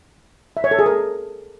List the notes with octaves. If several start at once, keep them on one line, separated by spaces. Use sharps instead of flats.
E5
C#5
A4
G#4
A#4